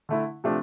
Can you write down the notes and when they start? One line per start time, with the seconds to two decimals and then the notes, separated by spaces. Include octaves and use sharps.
0.09 D3 A3 E4
0.44 C3 F3 A3 D4